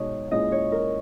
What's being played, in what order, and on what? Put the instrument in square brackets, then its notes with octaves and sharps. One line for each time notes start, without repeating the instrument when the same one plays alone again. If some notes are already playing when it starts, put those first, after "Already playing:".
Already playing: [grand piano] B2 G#3 D#4 [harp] C#5 D#5
[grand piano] A#2 G#3 C#4 E4 [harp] D#5
[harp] C#5
A#4